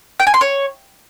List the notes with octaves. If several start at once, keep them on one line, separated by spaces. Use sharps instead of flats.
G5
G#5
C6
C#5